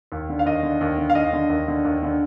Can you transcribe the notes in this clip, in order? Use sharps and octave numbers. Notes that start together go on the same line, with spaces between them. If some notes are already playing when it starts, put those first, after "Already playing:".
D#2
D3
F5
D#2 D#5
D3
D#2
D3
F5
D#2 D#5
D3
D#2
D3
D#2
D3